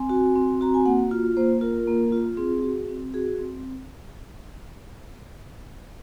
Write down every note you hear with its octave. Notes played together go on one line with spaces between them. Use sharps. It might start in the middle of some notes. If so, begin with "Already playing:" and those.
Already playing: C4 G#5
F#4
C4
F#4 A#5
G#5
A#3 F#5
F4
A#3 C5
F4 A#4
A#3
F4
C4 G#4
F#4
C4
F#4 G#4
C4